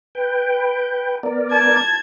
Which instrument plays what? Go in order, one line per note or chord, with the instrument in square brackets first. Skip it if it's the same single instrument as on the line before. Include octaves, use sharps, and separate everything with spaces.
[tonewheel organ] B4 G5
B3 A#4 D5
[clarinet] A5 [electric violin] G#6